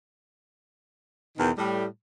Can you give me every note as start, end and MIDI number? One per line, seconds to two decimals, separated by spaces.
1.37 1.50 40
1.37 1.50 47
1.37 1.50 51
1.57 1.85 45
1.57 1.85 55